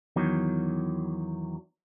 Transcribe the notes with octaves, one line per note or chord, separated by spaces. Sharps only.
E2 D#3 F#3